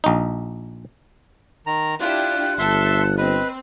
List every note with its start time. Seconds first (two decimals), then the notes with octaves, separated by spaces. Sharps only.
0.04 A#1 D#4
1.67 D#3 A#5
2.00 D4 E4 F4 G4 F#6
2.59 G1 A4 E5 C6
3.18 C4 B4 D#5